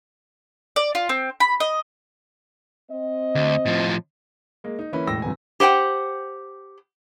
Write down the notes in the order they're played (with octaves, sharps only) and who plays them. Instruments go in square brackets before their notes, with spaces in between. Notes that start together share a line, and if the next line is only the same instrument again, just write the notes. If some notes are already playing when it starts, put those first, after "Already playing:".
[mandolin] D5
F4
C4
B5
D#5
[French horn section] C4 D#5
[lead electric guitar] D2
A2 F3
[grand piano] G#3 A#3
D#4
E3 A#3 C#4 E4 B4
E1 A2 G5 E6 A#6
G1 C3 E3 G#5
[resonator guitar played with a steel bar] G4 C5 F#5 G5